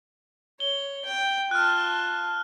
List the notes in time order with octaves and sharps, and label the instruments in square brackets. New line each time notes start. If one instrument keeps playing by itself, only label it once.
[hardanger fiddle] C#5 [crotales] G7
[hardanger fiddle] G5
[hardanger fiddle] F4 A5 [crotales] F6 F#6